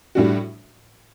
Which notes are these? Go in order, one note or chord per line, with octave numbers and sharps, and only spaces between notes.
A2 G3 D4 F#4